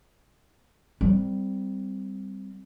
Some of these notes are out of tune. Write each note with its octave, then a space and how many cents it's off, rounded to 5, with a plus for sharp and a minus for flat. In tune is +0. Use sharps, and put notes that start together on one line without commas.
G3 +0 C4 -10